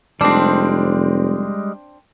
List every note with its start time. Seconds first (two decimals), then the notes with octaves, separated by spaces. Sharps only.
0.21 F1 G3 G#3 C4 D4